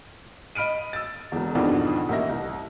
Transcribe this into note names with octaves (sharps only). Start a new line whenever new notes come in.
D#5 B5 F6 D7 D#7
E6 A6
E1 E2
F2 G#2 B2 D#3 F3 D4
A1 A#3 D#5 E5 A#6
C2